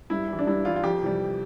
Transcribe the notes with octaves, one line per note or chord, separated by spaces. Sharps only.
G2 E4
E3 G3
D4
G2 E4
E3 G3 F4
F4
F2 G4
C3 E3 G3